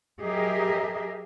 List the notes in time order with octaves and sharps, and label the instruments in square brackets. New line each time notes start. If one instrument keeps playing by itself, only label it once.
[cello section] F#3 G4 G#4 A#4 D#5 E5